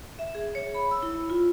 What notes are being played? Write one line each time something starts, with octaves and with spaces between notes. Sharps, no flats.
E5
G#4
C#5
B5
E6
E4
F4